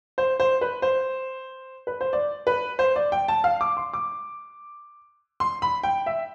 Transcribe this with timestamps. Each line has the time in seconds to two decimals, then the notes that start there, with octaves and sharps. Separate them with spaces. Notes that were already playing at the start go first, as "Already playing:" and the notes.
0.18 C5
0.40 C5
0.61 B4
0.82 C5
1.87 B4
2.01 C5
2.13 D5
2.47 B4
2.79 C5
2.96 D5
3.12 G5
3.28 A5
3.44 F5
3.61 D6
3.77 C6
3.93 D6
5.40 C6
5.62 B5
5.84 G5
6.06 E5